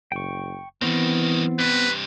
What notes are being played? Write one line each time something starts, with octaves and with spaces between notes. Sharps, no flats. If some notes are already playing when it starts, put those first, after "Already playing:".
F#1 G5 C#6
G2 D#3 E3 B3 C4
G2 C3 B4